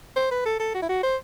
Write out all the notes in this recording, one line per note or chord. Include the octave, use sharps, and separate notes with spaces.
C5
B4
A4
A4
F#4
E4
F#4
C5